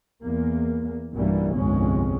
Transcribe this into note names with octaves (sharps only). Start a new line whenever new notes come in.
E2 A#3
B1 G2 B2 E3 G3 A#3
G1 C2 F2 G#3 C4 C#4